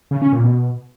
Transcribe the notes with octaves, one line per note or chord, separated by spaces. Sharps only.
C#3
C#4
A#2
B2